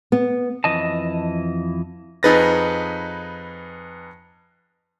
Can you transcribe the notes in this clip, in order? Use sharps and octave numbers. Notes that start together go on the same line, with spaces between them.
B3
F2 E3 D#5 A5
F2 D#4 G#4 B4 A6 A#6